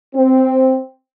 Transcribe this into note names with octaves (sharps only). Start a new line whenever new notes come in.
C4